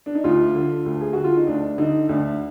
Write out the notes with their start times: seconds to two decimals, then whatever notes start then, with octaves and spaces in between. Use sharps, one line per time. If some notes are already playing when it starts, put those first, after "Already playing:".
0.06 D4
0.15 D#4
0.24 D2 F4
0.55 D3
0.86 D2
1.01 G#4
1.13 D3 F#4
1.24 F4
1.36 D#4
1.47 D2 D4
1.78 D3 D#4
2.09 D2 D4